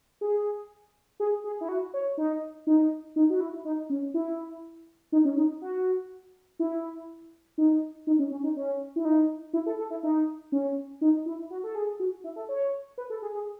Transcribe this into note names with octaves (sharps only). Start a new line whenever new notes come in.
G#4
G#4
G#4
E4
F#4
C#5
D#4
D#4
D#4
F#4
E4
D#4
C#4
E4
D#4
C#4
D#4
F#4
E4
D#4
D#4
C#4
C#4
D#4
C#4
E4
D#4
E4
A4
A4
E4
D#4
C#4
D#4
E4
F#4
A4
G#4
F#4
E4
A4
C#5
B4
A4
G#4
G#4